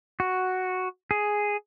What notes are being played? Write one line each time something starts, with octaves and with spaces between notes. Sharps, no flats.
F#4
G#4